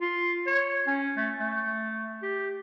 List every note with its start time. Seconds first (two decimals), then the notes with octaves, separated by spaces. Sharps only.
0.01 F4
0.47 C#5
0.87 C#4
1.17 A3
1.40 A3
2.22 G4